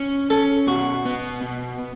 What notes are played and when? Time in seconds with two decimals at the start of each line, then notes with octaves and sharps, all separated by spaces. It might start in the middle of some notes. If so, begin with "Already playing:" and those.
Already playing: C#4
0.30 C#4 A4
0.67 B2 F#4
1.05 B3
1.42 B2